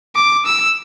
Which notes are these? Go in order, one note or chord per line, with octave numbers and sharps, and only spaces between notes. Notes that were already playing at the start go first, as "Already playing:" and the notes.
D6
E6